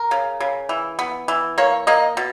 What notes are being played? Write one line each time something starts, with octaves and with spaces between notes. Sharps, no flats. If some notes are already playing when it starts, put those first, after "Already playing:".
Already playing: A#4
C#3
C#3
E3
B3
E3
A#3 C#5
A#3 D#5
B2